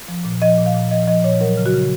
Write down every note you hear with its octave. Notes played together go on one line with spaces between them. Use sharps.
F3
A#2
F3 D#5
A#2
F5
A#2
F3 D#5
F3 D#5
A#2 C#5
F#3 A#4
C#3
F#4
C#3